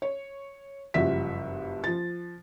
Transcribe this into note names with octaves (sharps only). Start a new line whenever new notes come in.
C#5
F#1 G2 F3 F#4 E5 B6
F3 A6